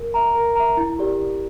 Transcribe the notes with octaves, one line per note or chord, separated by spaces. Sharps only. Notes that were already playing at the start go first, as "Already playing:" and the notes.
Already playing: A#4
E5 A#5
A#4
E5 A#5
E4
G4 A#4 D5
E4